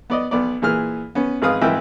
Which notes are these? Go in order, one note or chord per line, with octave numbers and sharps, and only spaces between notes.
B3 D5 D#5
B1 B3 D5
A#2 E3 G#4 F6
B3 C#4
G#1 G#4 B4 F5 D#6
G#1 E3 E4 F4 G5